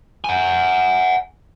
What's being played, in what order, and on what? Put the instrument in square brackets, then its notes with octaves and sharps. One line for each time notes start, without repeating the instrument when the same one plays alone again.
[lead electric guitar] F#5 G#5